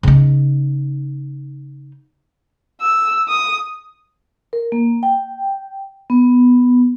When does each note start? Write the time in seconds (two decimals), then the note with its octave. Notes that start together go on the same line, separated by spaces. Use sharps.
0.03 C#3 D#4
2.81 E6
3.28 D#6
4.53 A#4
4.72 A#3
5.03 G5
6.10 B3